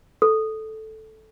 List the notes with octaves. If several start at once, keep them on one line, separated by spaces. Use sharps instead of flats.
A4